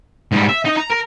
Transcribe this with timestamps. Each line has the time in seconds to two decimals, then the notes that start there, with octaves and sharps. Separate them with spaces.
0.32 G#2 G3
0.49 E5
0.65 D#4 D#5
0.77 A#5
0.90 A#4